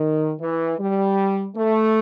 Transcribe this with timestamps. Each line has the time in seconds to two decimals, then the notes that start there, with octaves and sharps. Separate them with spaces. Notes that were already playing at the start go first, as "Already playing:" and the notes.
Already playing: D#3
0.41 E3
0.79 G3
1.56 A3